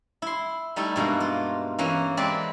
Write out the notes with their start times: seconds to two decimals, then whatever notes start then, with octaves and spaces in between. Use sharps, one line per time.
0.22 E4 C6
0.76 G3 A3 D#4 E4
0.96 G2 B2 G#3 A#3
1.20 F4
1.79 E3 A#3 C#4
2.17 G#3 C4 B4 D5